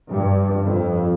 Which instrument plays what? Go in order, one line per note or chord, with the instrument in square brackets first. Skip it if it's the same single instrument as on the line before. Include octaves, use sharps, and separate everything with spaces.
[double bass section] G2
F2